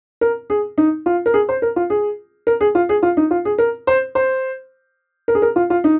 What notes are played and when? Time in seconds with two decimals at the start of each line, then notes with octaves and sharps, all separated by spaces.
0.21 A#4
0.50 G#4
0.78 D#4
1.06 F4
1.26 A#4
1.34 G#4
1.49 C5
1.62 A#4
1.76 F4
1.90 G#4
2.47 A#4
2.61 G#4
2.75 F4
2.89 G#4
3.03 F4
3.17 D#4
3.31 F4
3.45 G#4
3.58 A#4
3.87 C5
4.15 C5
5.28 A#4
5.35 G#4
5.42 A#4
5.56 F4
5.70 F4
5.84 D#4